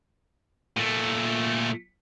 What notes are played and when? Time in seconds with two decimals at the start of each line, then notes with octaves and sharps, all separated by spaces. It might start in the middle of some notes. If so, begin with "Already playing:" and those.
0.77 A#2 A3